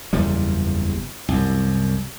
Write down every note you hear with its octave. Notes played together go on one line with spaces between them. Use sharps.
F#1 E2 A#2 G3
C2 F#2